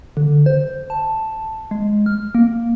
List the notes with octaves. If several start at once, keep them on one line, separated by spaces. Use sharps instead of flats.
D3
C5
A5
G#3
F6
A#3